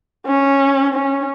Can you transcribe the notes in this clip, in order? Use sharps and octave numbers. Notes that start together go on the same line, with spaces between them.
C#4
C#4